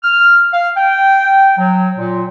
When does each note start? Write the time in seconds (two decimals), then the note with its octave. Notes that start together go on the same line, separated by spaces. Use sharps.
0.03 F6
0.53 F5
0.76 G5
1.58 F#3
1.97 A#2